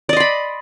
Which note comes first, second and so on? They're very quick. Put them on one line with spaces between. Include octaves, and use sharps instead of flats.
D5 D#5 C6 B5